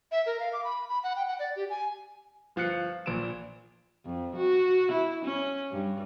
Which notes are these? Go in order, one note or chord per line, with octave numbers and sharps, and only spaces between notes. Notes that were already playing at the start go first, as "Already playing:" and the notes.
E5
A#4
F5
D6
B5
B5
F#5
G5
F#5
D5
G4
G#5
G1 F3 F5 F#6 C#7
A#1 A#2 D7 E7
F2
F#4
E4
C#4
G2